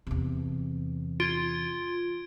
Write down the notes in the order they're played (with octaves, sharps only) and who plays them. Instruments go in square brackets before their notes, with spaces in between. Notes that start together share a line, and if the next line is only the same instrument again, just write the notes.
[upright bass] E2 C3
[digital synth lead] F4 [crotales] G#6 D7